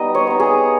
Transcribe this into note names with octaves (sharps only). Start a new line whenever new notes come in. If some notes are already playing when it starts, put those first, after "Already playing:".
Already playing: G3 B3 D#4 D#5 G5
C#5
B3 D#4
G#4